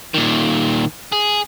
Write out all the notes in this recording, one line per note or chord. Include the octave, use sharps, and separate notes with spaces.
A#2 D#3
G#4